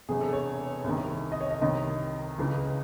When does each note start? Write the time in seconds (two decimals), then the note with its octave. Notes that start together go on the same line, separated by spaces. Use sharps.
0.09 E1 E2 C3 G#4
0.21 A4
0.33 C#5
0.84 C2 C3 D#3
1.32 D#5
1.41 C#5
1.50 D#5
1.61 C2 C3 D#3 D#5
2.38 C#2 C#3 E3